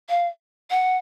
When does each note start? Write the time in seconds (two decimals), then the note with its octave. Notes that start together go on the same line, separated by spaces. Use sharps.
0.09 F5
0.70 F#5